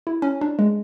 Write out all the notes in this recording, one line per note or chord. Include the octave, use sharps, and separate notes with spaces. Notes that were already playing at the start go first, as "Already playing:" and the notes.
E4
C#4
D4
G#3